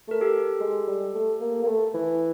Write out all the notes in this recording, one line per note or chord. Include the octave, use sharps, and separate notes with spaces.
A3 A#4
G4 A4
G#3
G3
A3
A#3
A#3
A3
E3